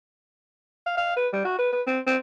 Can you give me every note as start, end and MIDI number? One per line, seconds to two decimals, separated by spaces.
0.86 0.93 77
0.97 1.14 77
1.16 1.28 71
1.33 1.44 55
1.45 1.57 66
1.59 1.71 71
1.72 1.81 71
1.87 2.00 60
2.06 2.17 60